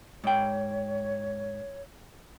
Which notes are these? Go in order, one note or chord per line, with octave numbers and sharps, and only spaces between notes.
G#2 C#5 G5